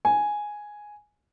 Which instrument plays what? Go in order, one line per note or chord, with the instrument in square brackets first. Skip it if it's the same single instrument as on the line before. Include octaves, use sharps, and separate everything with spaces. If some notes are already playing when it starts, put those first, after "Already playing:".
[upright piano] G#5